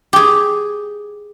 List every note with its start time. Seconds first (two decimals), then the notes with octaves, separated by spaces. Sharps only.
0.13 G4 G#4